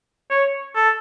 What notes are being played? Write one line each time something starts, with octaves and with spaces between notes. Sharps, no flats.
C#5
A4